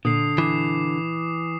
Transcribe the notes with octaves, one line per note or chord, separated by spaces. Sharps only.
A#2 D3 D#6 C7
E3 D6 C7